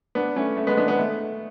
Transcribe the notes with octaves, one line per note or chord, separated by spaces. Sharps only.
B3 D4
A3 C#4
A3
G#3 B3
B3 D4
G#3 B3
A3